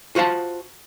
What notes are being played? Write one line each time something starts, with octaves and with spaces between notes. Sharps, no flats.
F4 F#4 C5 F5 A5